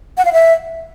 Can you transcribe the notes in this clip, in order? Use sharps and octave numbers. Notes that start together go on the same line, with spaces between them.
F#5
F5
E5